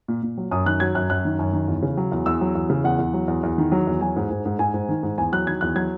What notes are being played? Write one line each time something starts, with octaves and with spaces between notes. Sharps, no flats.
A#2
A#2
F#3
F#2 D#6
D#3 F#6
F#3 G#6
F#2 F#6
F#2 F#6
D#3
F#2
D#3
E2
C#3
F#3
E2
E2 E6
F#3
E2
C#3
E2 F#5
E2
F#3
E2
E2
D#3
F#3
E2
F#3 G#5
G#2
G#2
G#2
G#2 G#5
G#2
D#3
G#2
E2 G#5
F#3 F#6
D#3 G#6
E2 F#6
F#3 G#6